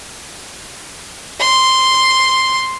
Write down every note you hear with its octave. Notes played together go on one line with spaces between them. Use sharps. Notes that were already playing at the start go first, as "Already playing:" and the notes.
C6